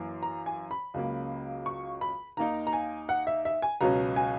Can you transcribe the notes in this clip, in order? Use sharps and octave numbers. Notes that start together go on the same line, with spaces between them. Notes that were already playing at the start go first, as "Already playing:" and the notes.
Already playing: F#2 E3 A#3
A#5
G#5
B5
C#2 C#3 F#3 A#3
C#6
B5
D#2 D#3 A#3 D#4 A#5
A#5
G#5
F#5
E5
E5
G#5
C#2 B2 F#3 C#4 A#5
G#5